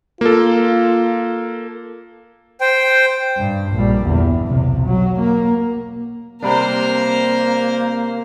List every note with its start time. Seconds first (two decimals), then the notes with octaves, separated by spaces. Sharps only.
0.21 A#3 F4 A4
2.61 C5 G5
3.38 G2
3.73 A#1 G3
4.06 G1 E2
4.48 B1 C3
4.87 F#3
5.19 A#3
6.43 C3 G3 A#3 C4 D4 A#4 C5